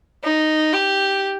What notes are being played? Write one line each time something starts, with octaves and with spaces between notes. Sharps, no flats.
D#4
G4